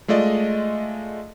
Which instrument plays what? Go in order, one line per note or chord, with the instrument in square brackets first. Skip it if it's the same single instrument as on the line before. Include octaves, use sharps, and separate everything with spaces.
[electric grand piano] G#3 A3 F4 D5 D#5